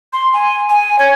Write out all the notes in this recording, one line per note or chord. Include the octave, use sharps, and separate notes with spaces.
C6
G#5
G#5
C#5